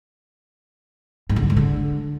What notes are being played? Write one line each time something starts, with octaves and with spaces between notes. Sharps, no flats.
G#2
D3
G3
G#2
D3